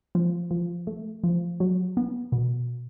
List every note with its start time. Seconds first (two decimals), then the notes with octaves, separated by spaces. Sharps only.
0.15 F3
0.51 F3
0.87 A3
1.24 F3
1.60 F#3
1.97 B3
2.32 B2